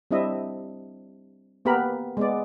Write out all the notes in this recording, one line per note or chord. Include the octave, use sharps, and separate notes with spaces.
G3 C4 D4 E4 D#5 E5
A#3 B3 G4 A#4 B5
G#3 B3 D5